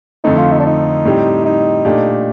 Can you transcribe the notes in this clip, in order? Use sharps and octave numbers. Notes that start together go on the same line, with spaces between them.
F2 D3 A3 C4 D#4
F4
D#4
D4
D#4
A2 G3 C4 G4
D#4
A#2 A3 D4 G4